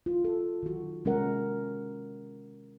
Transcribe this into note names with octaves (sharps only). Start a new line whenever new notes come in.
F4
A4
D#3 F#4
C3 G#3 C#4 F#4 A#4 F#5